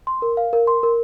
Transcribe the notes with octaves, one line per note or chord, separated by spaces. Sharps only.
C6
A#4
F5
A#4
C6
A#4